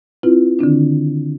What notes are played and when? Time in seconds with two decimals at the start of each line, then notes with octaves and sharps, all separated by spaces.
0.23 C4 E4 F4 B4
0.59 D3 D#3 C4 D4